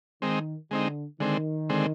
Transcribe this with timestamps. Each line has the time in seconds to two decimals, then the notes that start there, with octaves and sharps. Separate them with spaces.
0.22 D#3 G#3 C4 D#4
0.71 D3 G#3 C4 D#4
1.20 D3 D#3 G#3 C4
1.69 D3 G#3 C4